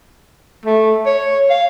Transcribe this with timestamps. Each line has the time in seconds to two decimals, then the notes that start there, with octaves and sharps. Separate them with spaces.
0.66 A3
1.06 C#5
1.50 F5